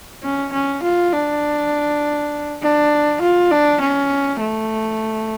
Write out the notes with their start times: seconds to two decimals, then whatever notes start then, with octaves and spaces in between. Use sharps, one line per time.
0.23 C#4
0.53 C#4
0.83 F4
1.12 D4
2.62 D4
3.21 F4
3.51 D4
3.81 C#4
4.40 A3